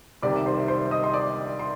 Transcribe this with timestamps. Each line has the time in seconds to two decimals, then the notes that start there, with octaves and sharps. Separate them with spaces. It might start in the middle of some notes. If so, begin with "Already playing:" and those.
0.22 C2 C3 D#3 D5 D6
0.46 C5 C6
0.68 C5 C6
0.91 D#5 D#6
1.04 C6
1.14 D5 D6
1.59 C6